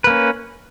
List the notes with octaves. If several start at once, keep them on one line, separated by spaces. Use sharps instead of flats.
A#3 C#4 B4